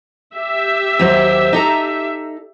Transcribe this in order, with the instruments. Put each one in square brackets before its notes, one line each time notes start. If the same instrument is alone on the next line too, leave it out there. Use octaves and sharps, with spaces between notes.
[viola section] G4 E5
[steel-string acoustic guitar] D#2 F#3 C5
D#4 A4 A#5